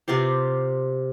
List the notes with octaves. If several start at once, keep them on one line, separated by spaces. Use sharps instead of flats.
C3 F4 G4 C5